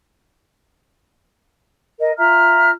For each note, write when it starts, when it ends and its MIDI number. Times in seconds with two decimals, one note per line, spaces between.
2.00 2.12 70
2.00 2.12 75
2.18 2.70 65
2.18 2.70 76
2.18 2.70 82
2.18 2.70 89